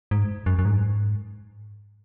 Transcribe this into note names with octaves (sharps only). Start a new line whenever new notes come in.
G#2
F#2
F#2
G#2